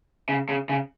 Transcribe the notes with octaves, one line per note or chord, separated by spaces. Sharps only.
C#3
C#3
C#3